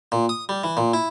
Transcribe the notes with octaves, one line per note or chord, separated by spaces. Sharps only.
A#2
D#6
G3
E3
A#2
E4